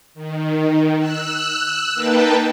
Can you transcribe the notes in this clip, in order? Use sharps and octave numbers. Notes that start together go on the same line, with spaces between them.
D#3
E6 F#6
A#3 D#4 B4 G5 A5